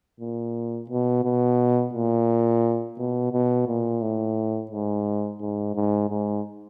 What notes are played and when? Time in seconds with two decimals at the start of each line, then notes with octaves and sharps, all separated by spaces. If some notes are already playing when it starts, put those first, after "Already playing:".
0.20 A#2
0.90 B2
1.24 B2
1.93 A#2
2.98 B2
3.32 B2
3.68 A#2
4.02 A2
4.71 G#2
5.40 G#2
5.75 G#2
6.10 G#2